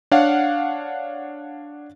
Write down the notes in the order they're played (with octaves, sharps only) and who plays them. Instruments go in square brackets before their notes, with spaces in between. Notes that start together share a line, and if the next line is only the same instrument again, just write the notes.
[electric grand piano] D4 C#5 F5 F#5